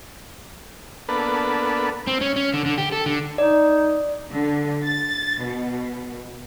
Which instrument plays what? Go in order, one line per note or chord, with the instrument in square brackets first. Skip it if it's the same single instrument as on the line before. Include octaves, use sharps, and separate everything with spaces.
[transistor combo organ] A#3 B3 D4 A4 B4
[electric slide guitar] C4
C#4
C#4
D3
D3
G4
A4
D3
[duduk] D#4 [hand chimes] D5
[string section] D3
A6
B2